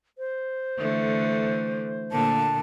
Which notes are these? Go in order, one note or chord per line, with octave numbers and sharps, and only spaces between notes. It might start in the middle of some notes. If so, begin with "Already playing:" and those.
C5
D3 E3 A3
A#2 D3 A#3 A5